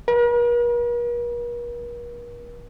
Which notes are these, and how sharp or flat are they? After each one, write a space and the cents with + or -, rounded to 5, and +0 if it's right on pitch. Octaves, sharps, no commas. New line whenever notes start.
A#4 +45